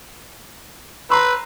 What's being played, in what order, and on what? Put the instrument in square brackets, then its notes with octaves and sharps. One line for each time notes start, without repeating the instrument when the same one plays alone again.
[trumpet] B4 [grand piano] A#5 C6 E6